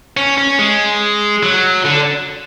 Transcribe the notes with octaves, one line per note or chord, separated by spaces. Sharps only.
C#4
C#4
G#3
F#3
D3